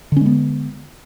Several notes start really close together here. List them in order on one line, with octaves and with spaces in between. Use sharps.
D3 C#4 G#3 B3